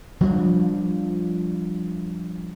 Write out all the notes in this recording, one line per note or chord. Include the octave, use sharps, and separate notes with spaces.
F3 G3 D4